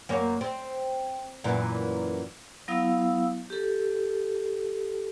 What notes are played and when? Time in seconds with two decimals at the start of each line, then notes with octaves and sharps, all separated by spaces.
0.09 F#2 A#3 C#5
0.41 C4
1.44 F#2 A#2 E3
2.68 F#3 B3 E4 F5 D#6 E6
3.50 G4 A4